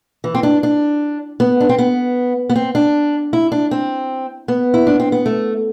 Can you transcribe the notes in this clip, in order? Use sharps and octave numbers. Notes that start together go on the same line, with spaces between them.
E3
C4
D4
D4
B3
D4
C4
B3
B3
C4
D4
E4
D4
C4
B3
E4
D4
C4
B3
A3